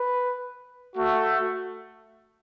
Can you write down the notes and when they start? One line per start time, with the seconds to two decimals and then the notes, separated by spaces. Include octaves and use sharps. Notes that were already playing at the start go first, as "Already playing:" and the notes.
Already playing: B4
0.96 A3 F#4